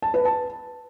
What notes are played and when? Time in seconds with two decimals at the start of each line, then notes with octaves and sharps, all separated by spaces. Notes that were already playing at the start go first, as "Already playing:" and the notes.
0.02 A5
0.14 B4
0.25 A5